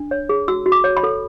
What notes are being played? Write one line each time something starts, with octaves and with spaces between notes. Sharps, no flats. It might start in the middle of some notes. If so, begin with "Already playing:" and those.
Already playing: D4
C#5
G#4
F#4 E6
F#4
D6
C#5
B5
A4